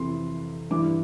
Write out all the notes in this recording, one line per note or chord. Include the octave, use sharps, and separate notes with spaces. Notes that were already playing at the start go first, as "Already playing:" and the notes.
Already playing: F2 C3 E3 C6
G2 E3 D6